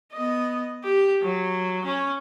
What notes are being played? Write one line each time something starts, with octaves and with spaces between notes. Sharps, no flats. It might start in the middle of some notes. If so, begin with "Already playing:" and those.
B3 D#5
G4
F#3
C#4